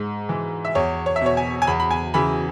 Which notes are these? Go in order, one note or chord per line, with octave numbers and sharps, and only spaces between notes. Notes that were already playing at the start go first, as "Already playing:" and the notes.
Already playing: G#2
E3
E5
E2 C#5
C#5
E5
B2 C#5
G#5
G#5
E2 B5
B5
G#5
C#3 E3 B5